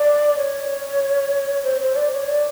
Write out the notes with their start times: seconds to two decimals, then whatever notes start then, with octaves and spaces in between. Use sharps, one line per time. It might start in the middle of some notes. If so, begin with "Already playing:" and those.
Already playing: D5
0.37 C#5
1.64 C5
1.81 C5
1.96 D5
2.12 C#5
2.27 D5